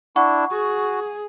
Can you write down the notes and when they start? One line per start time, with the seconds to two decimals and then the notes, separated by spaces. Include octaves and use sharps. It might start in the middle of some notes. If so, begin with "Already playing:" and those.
0.16 D4 E4 F#5 C#6
0.51 F#4 G#4